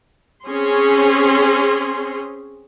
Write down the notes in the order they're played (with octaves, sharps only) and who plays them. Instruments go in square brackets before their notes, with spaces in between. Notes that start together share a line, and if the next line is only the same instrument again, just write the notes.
[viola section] C4 C#4 G#4 C6